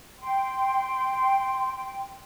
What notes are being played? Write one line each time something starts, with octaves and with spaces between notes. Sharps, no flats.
G5 C6